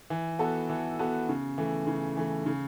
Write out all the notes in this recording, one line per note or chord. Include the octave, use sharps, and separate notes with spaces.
E3
B3 F#4 A4
E3
B3 F#4 A4
C#3
E3 A3
C#3
E3 A3
C#3